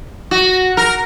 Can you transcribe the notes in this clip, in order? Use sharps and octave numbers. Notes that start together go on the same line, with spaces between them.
F#4
A#4